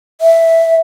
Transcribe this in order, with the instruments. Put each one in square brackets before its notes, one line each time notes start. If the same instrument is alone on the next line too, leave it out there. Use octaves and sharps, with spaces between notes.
[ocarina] E5